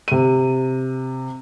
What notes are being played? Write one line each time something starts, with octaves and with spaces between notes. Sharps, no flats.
C3 D#7